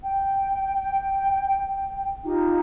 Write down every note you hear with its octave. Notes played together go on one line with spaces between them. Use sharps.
G5
D#4 F4 G4